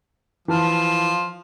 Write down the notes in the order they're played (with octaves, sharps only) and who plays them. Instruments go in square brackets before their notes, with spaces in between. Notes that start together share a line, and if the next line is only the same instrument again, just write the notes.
[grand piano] E3 A5 F6 [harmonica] F3